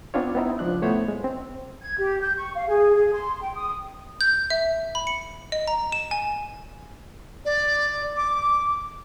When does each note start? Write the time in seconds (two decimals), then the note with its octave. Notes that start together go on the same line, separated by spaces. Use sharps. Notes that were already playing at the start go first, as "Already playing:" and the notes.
0.14 B3 C4 D4 F4 C#5
0.35 B3 C4 D#4 E4
0.59 C#2 F3 D4 F#6
0.82 A2 A3 B3 C5 C#5 B5
1.08 G#3
1.24 C4
1.81 G#6
1.98 G4
2.21 G6
2.36 C#6
2.56 F5
2.68 G#4
2.95 G#4
3.13 C6
3.42 G5
3.55 D#6
4.21 G6
4.50 E5
4.95 B5
5.07 C#7
5.52 D#5
5.67 A#5
5.92 E7
6.11 G#5
7.45 D5
8.16 D6